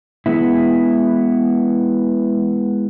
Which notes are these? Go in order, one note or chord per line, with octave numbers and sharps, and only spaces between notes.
E3 G#3 B3 E4